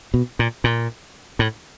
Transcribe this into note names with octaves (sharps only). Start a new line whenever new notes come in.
B2
A#2
A#2
A2